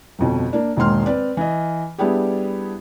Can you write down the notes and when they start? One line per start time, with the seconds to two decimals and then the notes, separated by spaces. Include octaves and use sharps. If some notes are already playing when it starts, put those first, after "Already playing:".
0.19 G1 F2 B2
0.53 A#3 D4
0.76 E1 G#2 D#3 A#3 C6 F6
1.06 C4 B4 D5
1.37 E3 D#5
1.98 G3 B3 D4 E4 G4 G#4